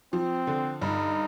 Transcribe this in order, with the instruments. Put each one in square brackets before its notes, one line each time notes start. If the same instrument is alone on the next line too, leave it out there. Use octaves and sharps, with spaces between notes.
[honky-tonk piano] F3 [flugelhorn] C4
[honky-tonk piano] D3
[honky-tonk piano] G2 [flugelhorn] D#4